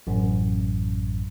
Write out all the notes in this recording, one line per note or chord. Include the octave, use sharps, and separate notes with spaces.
A1 F#2